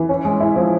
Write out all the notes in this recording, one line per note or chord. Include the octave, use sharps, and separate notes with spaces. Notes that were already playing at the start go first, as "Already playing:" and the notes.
Already playing: E3
C#4
G#3
E4
F3